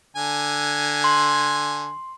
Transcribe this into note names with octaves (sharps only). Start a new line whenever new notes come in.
D3 G#5
C6